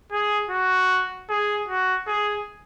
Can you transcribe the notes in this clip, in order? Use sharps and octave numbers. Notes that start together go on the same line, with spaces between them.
G#4
F#4
G#4
F#4
G#4